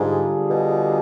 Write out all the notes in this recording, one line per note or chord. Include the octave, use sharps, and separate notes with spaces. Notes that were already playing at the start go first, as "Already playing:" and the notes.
Already playing: G#2 D3 G3 D4 F4 G#4
B2